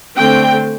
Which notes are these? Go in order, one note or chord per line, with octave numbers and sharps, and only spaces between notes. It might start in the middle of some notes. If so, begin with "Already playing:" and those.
D3 A3 C4 G5